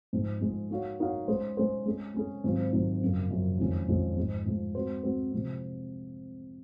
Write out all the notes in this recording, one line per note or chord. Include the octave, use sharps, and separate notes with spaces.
G#2 F3 G#3
G#2 F3 G#3
A#3 D#4 F#4 C#5 F5
A#3 D#4 F#4 C#5 F5
G#3 C#4 G#4 C5
G#3 C#4 G#4 C5
G#3 C#4 G#4
G#3 C#4 G#4
G#2 D#3 F#3 C4 F4
G#2 D#3 F#3 C4 F4
F#2 C#3 F3 A#3
F#2 C#3 F3 A#3
F2 D#3 G#3 C#4 F4
F2 D#3 G#3 C#4 F4
G#2 F3 G#3
G#2 F3 G#3
G#3 C4 F#4 C5
G#3 C4 F#4 C5
C3 F3 G#3 C4